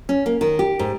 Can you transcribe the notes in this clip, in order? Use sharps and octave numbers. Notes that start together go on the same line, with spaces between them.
C#4
A#3
D#3
G4
G#2